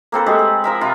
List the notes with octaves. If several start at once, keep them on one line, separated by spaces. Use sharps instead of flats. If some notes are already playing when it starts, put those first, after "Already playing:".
A#3 C4 A4 B4
G#3 A3 G4
G#4
F3 A#4 E5
C3 F4 B4